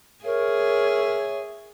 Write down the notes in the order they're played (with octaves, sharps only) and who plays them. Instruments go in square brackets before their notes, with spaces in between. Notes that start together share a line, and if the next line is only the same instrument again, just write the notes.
[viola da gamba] G#4 [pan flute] A#4 [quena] C#5 [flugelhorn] E5